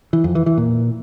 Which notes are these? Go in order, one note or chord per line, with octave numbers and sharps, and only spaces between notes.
E3
F2
E3
E3
A#2